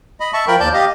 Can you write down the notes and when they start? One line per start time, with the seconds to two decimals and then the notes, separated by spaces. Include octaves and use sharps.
0.20 D#5 B5
0.33 E5 A5 C#6
0.48 F3 A#4 G5 B5
0.60 D#2 D5 A5 G6
0.74 G4 D#5 F5